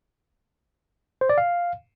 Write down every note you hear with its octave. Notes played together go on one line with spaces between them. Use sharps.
C5
D5
F5